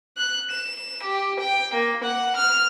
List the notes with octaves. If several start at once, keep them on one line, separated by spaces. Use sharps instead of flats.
F#6
E7
G4
G5
A#3
F#5
F6